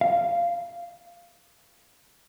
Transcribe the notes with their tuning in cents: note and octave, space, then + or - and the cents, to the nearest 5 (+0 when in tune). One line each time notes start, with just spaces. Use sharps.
F5 -10